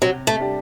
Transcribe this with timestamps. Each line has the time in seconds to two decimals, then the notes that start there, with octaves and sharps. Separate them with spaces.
0.02 C3 F#3
0.27 A3
0.40 G3 D4 G4